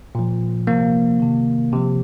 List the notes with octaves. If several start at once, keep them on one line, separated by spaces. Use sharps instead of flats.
A#2 F3
C3 F3 A#3
C3 D#3
C3 F3